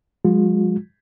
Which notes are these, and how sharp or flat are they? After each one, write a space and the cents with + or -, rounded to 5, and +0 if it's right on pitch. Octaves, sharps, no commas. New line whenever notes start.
F3 +35 G#3 -20 F4 +40